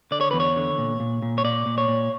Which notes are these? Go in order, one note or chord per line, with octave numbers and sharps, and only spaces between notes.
D3 D5
C#5
E2 B4
C#5
D3
A#2
A#2
A#2
C#5
A#2 D5
A#2
C#5
A#2